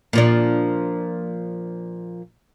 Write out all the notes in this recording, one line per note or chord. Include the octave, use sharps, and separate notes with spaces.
A#2 F3 D4